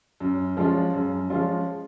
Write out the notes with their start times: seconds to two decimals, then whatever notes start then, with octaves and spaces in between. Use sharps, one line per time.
0.20 F#2
0.57 F3 G#3 C#4 F4
0.94 F#2
1.30 F3 G#3 C#4 F4